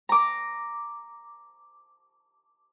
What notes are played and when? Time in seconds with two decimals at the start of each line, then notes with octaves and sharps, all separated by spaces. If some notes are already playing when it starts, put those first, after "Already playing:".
0.09 A#5 D6